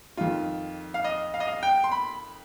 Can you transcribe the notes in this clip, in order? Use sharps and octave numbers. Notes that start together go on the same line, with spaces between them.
F2 D#3 F4
F5
D#5
F5
D#5
F5
G5
C6
B5